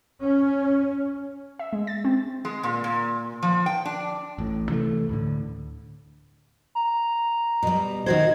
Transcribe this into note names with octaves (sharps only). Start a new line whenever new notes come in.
C#4
E5
G#3
A6
C4
G#3
A#2
A#2
F3
G5
D4
A1 A2
C3 E3 G3 A3
D2 A2 D3
A#5
B2 G3
D#3 F#4 C5 G#6